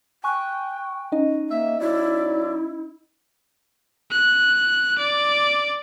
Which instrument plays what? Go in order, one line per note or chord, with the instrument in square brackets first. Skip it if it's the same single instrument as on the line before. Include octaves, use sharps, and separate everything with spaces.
[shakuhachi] G5 [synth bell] G#5 C#6 F#6
[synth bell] C#4 D#4 D#5
[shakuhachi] A#3 [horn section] E5
[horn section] F#3 D5 [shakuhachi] E4
[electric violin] F#6
D5